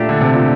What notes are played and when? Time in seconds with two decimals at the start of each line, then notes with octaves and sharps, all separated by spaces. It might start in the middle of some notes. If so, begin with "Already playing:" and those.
Already playing: A#2 A3 D4 G4
0.09 D3
0.21 C3
0.34 A#2